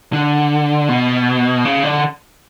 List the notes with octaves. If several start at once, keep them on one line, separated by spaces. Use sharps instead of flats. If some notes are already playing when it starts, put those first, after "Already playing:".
D3
B2
C#3
D3